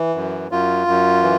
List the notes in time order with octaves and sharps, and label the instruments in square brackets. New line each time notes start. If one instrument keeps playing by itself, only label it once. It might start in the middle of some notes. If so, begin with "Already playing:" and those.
Already playing: [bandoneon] E3
F#2
F#2 F4
F#2
E3